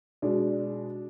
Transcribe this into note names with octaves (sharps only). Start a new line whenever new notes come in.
B2 G#3 D4